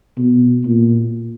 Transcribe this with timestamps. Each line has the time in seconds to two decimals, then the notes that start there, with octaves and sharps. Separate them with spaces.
0.18 B2
0.66 A#2